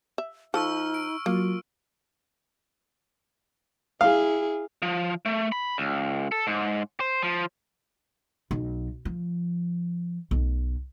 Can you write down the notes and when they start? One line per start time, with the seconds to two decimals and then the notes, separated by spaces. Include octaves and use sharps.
0.18 E5
0.54 F3 D#4 A4 C#6 E6 F6
0.94 D7
1.26 F#3 A#3 F4
4.01 E4 G#4 F5
4.82 F3
5.26 A3
5.52 B5
5.78 C#2
6.32 A4
6.47 G#2
7.00 C5
7.22 F3
8.51 B1
9.05 F3
10.31 B1